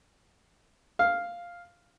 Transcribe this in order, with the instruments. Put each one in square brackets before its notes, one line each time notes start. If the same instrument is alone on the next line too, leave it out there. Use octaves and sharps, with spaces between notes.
[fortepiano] F5